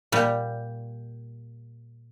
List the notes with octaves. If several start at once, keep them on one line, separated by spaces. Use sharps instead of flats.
A#2 G3